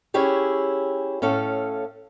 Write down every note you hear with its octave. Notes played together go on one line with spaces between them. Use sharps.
C#4 E4 G4 G#4 C#5
A2 C#4 A4 F5